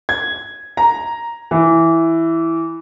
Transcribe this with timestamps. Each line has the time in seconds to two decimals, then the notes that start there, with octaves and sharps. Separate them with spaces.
0.09 G#6
0.77 A#5
1.51 E3